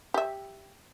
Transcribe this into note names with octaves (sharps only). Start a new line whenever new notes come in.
G4 E5